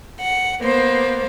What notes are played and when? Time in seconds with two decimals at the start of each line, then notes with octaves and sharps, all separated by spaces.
0.21 F#5
0.61 A#3 B3 C5